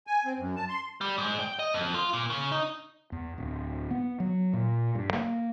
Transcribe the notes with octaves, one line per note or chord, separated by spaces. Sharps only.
G#5
C4
F#2
A5
C6
G3
G#2
G5
D#5
F2
F4
A#2
C#3
D#4
E2
D1
B3
F#3
A#2
G2
A#3